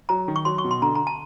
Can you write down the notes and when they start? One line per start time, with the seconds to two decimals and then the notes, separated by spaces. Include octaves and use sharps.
0.09 F#3 A#5
0.28 D#3
0.36 C#6
0.45 F#3 C6
0.58 C#6
0.64 B2
0.71 C6
0.82 D3 A#5
0.95 A#5
1.07 A5